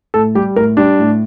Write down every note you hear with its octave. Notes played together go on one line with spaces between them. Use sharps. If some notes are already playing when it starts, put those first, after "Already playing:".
A2 A4
G3 G4
A2 A#4
G3 D4
A2